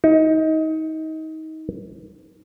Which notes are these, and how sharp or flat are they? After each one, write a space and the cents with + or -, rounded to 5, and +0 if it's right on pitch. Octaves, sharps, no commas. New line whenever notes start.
D#4 +25